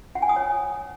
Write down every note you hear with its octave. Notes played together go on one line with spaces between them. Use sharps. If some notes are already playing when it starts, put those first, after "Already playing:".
F#5
G#5
D#6
C#5